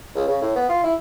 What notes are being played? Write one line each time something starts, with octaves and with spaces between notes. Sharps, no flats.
C#2
C#3
A2
B3
F4
E4